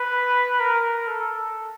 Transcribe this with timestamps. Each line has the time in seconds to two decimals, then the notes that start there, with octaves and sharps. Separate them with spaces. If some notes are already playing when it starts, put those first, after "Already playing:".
Already playing: B4
0.60 A#4
1.07 A4